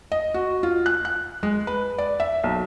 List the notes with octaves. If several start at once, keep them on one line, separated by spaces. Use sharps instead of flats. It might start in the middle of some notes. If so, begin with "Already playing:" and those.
D#5
F#4
F4
F#6
F#6
G#3
B4
D5
E5
B1